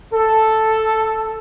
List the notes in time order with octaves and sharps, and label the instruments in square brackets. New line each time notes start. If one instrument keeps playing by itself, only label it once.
[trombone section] A4